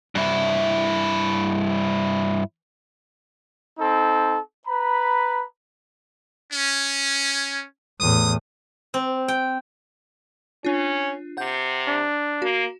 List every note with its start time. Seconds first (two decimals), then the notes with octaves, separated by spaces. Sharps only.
0.15 G2 E4
3.78 C4 D#4 A4
4.66 B4 A#5 B5
6.52 C#4
8.00 E2 A2 D#6
8.94 C4
9.28 G5
10.65 C#4 D4 F4
11.37 C3 F#5 G6
11.88 D4
12.42 A#3 F#4